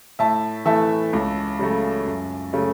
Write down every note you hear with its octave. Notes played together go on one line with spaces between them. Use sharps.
A2 E5 A5
E3 A3 E5 A5
C#2
C#3 F#3 A3
F#2
C#3 F#3 A3